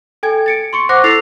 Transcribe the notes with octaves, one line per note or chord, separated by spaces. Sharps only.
A4 G5 G#5 G#6
A6 C#7 D7
C6 C#6 C#7
C5 F#5 D6 F#6 A#6
E4 A4 E6 A6 C7 F7